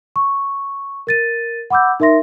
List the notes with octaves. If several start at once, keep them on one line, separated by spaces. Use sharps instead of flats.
C#6
A#4 A6 D#7
F#5 B5 D6 E6 G6
D#4 A#4 E5 C6 A#6